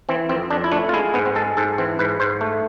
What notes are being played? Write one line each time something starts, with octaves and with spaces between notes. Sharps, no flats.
E3 C4
F2 C4
F2 D4
E4
A3 D4
F4
G#3 E4
G#2 B3
C4
G#3 A4
G#2 A4
E3 C4
G#2 B4
G#2 C5
A3